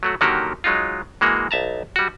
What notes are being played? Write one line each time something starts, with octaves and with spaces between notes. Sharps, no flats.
F#3 A3 F#4
D3 D#3 F#3 A#3 F#4 G4
F#3 G#3 D#4 F4
E3 G#3 A#3 F#4
B1 E5 A5 A#5
G3 F#4